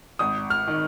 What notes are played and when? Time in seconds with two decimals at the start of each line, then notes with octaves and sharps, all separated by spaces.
0.19 G#1 D#6
0.50 F6
0.68 D#3